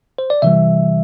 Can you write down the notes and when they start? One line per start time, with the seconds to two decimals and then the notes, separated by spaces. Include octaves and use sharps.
0.18 C5
0.30 D5
0.42 C3 E3 G3 E5